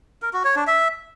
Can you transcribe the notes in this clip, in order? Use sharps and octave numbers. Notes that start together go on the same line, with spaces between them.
A#4
F#4
C#5
D4
E5